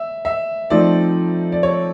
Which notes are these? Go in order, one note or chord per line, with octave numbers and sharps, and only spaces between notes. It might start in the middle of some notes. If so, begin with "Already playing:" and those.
Already playing: E5
E5
F3 A3 C4 D#4 D5
D5
C#5